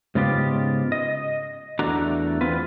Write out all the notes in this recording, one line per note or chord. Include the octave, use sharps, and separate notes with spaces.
G#2 C#3 B3 F4 G4
D#5
E2 A3 D4 F#4 A#5
E2 C4 F4 B4